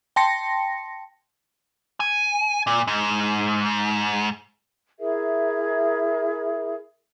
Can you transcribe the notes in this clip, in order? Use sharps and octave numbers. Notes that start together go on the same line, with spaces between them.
G5 A5 C6 A#6 C#7
G#5
A#2
G#2
E4 G#4 A#4 E5